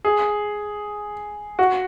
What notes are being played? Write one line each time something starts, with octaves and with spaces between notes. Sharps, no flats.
G#4
F#4